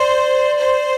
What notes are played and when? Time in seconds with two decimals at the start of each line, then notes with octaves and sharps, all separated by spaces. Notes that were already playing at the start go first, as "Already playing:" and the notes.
Already playing: C5 D5
0.58 C5